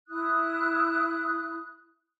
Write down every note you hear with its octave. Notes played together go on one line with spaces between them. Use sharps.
E4 D#6 F#6